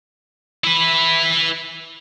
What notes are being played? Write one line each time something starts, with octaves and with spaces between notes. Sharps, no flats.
E4 B4